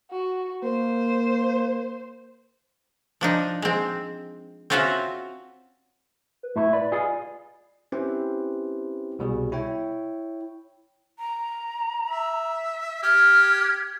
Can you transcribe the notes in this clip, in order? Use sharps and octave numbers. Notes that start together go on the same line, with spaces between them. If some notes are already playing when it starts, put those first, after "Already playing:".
F#4
A#3 C5
F3 D4 D#4
G#3 C4
C4 C#4 F4 F#4 C5 E5
B4
A2 E4 E5
B4 D5
F4 G#4 D#5
C4 C#4 E4 G4 B4 C5
C2 B2 G3 G#4
E4 C#5 G5
A#5
E5
G4 F6 G#6